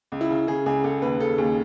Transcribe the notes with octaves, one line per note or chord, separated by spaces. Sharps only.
C#2
E4
C#3
C#3 G#4
C#2 G#4
C#2 A4
D#2 B4
C#3 A4
D#2 G#4